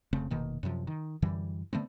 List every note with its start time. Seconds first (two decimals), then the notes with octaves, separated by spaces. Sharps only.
0.13 F1 C#3 A3 C4
0.30 F1 B2 D#3 A#3
0.63 F#2 C3 D#3 F3
0.87 D#3
1.22 F#2 D3 E3 G3
1.73 D3 A3 B3 C4